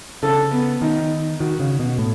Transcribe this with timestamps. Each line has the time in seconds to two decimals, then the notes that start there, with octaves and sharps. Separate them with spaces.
0.23 C#3 A4
0.52 B3
0.82 D#3 D#4
1.40 D#3 F#4
1.60 C#3
1.79 B2
1.98 A2